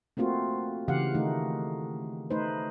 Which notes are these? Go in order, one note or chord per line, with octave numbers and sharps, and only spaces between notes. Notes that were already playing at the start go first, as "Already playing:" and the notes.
A3 A#3 C4 F4 F#4
C#3 E3 G4 F5 F#5
D#3 A3 D#4
A3 D#4 B4 C5